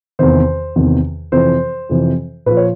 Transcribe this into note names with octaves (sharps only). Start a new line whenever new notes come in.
E2 C3 D#3 C5
E2 C3 D#3
F2 C3 E3 C5
F2 C3 E3
A#2 F3 B4
C#5